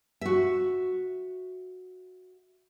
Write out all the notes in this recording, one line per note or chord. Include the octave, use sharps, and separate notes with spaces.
F#4 E5